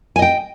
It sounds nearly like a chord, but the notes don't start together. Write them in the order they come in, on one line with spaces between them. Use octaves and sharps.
G#5 D#5 G5